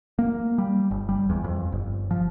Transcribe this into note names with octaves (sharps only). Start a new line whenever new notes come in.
A#3
G3
G1
G3
E2
F2
G1
F3